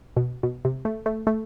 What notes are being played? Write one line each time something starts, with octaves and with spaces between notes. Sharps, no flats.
B2
B2
C3
A3
A3
A3